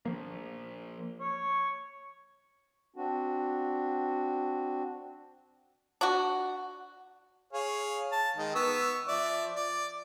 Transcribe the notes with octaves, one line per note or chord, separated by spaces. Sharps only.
F3 A#3
C#5
C4 D4 F#4
D4 F#4
G#4 C#5 F5
A5
D#3 G#3
B3 C#6 E6
F3 D5 E5
D5